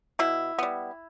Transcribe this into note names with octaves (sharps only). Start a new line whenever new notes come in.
B2 E4
G3 B3